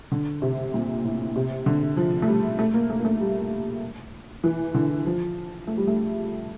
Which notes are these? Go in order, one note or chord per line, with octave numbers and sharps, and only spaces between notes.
D3
C3
A#2
A2
C3
D3
F3
A3
G3
A3
A#3
A3
A#3
A3
G3
E3
D3
F3
A3
G3
A3